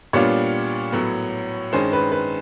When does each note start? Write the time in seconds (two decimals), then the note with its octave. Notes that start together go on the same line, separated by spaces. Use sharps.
0.13 A#2 G3 B3 D4 F4 C#5
0.92 A2 F#3 B3
1.72 G2 D#3 G#3 C#4 C5
1.93 B4
2.12 B4